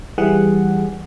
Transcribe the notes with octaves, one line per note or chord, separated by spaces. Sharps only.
E3 G3 G#4 F#5